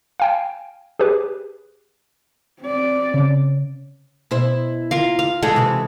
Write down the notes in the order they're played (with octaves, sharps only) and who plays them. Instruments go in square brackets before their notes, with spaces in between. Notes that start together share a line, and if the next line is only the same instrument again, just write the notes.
[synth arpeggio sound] F5 G5 G#5
G4 G#4 B4
[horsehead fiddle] C4 D5
[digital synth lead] C#3
[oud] B2 E4 C5
[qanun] F4 A#4 F5
F5
[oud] D3 E3 D#4 [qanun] G#3 G#4 A4
[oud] C3 E3